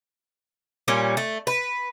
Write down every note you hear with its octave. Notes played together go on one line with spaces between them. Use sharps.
A#2 G3 C#4
A3
B4